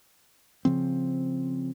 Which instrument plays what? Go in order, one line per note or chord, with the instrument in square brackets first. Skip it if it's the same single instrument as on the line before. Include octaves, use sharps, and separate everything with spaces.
[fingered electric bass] C#3 F3 C4